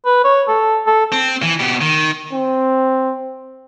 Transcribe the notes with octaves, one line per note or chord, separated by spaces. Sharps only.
B4
C#5
A4
A4
C4
E3
B2 G4
D#3
C4